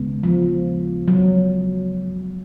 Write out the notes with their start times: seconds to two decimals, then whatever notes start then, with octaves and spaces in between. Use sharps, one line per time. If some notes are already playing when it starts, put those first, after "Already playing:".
Already playing: D#2 C#3 G#3 B3
0.23 F3
1.08 F#3